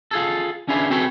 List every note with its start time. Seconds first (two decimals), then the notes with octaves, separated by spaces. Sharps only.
0.11 F4 G#4 A4
0.68 C#4 D4 E4 F4 G#4 B4
0.90 C4 F#4 G#4 A4 B4 G5